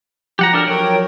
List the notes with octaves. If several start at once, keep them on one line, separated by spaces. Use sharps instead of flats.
F3 F#3 G4 F#5 A#5
D4 A4 A#4
A#4 C#5 G5